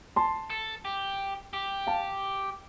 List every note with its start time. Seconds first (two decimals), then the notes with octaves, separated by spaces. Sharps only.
0.16 A5 C6
0.50 A4
0.85 G4
1.53 G4
1.87 F5 A5